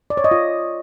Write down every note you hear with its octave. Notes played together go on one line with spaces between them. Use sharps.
D5
C#5
D#5
F4